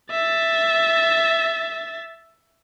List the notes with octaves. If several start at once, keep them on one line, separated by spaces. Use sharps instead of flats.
E5 A6